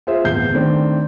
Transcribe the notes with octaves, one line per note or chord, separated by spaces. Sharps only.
F4 G#4 C5 E5
D1 G1 E2 G6 C7
D#3 A3 C4 D4